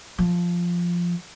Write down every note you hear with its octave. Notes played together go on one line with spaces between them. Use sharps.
F3